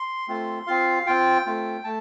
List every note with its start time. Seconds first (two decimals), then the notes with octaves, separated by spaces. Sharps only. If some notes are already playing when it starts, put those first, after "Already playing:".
Already playing: C6
0.28 A3 C4 F4
0.67 C4 F4 F5
1.06 C4 F4 G5
1.46 A3 C4 F4
1.84 A3 A5